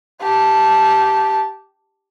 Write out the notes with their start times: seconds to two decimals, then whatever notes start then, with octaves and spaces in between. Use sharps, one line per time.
0.22 G4 A5